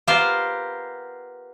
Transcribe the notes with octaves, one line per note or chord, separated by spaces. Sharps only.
B3 F4 G4 A#4 C5 F5